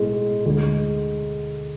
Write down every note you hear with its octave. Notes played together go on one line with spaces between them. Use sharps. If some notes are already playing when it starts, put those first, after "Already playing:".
Already playing: B1 A2 G#3
D2 D3 G#3